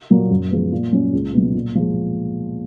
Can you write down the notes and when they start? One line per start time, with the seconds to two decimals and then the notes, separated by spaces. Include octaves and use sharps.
0.10 A#2 F#3 A#3
0.30 F#2
0.51 F3 G#3 B3
0.72 A#2
0.93 F#3 C#4
1.13 C#2
1.33 B2 F#3
1.54 A#2
1.75 F3 G#3